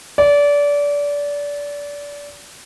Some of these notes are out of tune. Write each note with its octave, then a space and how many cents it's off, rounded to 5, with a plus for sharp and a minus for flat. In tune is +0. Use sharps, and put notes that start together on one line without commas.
D5 -25